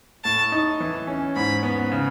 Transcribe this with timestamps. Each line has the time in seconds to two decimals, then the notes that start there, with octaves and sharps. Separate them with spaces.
0.24 A2 A5
0.52 D#4
0.80 E3
1.07 C#4
1.36 G#2 B5
1.63 B3
1.92 C#3